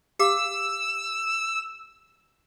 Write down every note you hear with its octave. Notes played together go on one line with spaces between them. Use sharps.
G4 F5 D6 E6